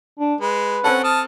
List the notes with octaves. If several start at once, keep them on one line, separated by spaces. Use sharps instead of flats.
D4
G#3 B4
C4 C#4 A4 F#5
A5 D#6 F6